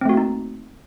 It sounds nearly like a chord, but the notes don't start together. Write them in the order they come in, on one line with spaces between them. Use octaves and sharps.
C4 A3 F#4 A#3 D#4